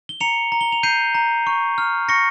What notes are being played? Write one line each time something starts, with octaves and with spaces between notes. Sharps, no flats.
G7
A#5 C#7 F7
A#5
G7
F7
G6 C7 D#7
A#5
C#6
F6
C#6 A#6 C#7